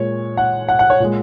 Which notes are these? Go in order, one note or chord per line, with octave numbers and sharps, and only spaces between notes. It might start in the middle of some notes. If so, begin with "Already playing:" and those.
Already playing: A#2 G#3 C#5
F#5
F#5
F#5
C#5
A#2 G#3